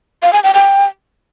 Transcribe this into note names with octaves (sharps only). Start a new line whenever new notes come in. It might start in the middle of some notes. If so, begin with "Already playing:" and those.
F5
G#5
G5
G5